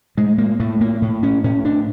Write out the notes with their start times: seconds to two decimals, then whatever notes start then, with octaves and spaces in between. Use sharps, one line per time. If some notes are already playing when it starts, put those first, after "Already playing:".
0.17 A2 G#3
0.38 A#3
0.60 A2 A3
0.81 A#3
1.02 A2
1.23 C#4
1.44 A2 C#4
1.65 D4